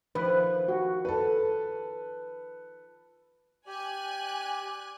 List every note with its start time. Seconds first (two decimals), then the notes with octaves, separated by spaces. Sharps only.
0.15 D#3 F3 E4 B4
0.68 F#4
1.05 A4 B4
3.67 G4 D5 G#5 F#6